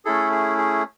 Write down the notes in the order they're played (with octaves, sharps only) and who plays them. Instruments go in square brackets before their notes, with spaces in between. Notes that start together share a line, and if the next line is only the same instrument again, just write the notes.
[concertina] A3 C#4 E4 G#4 A4
G#4
G#4